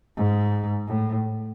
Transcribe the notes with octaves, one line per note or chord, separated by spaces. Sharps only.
G#2
A2